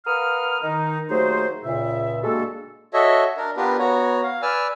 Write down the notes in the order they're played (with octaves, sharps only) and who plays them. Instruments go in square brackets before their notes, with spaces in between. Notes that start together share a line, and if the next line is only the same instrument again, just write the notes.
[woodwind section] A#4 B4 F5 F#5 D#6 F6
D#3 D#4
D#2 F#3 A3 D#4 G#4 C5
C#2 A#2 C#3 E5
G3 G#3 A#3 D4 F#4 A4
[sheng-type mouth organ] F#4 A4 C#5 D#5 E5
D4 A#4
B3 D4 F4 G4 A#4 B4
B3 F#4 C#5 A#5
F5
B4 D5 G#5 E6 F6